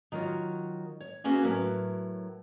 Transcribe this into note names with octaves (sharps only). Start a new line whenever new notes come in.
D#3 F#3 F4 C#5
C#5
A#3 B3 C#4 F#4 G#4
A2 F#3 A#4 B4